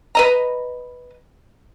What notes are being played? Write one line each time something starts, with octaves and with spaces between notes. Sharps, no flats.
B4 D#5 A#5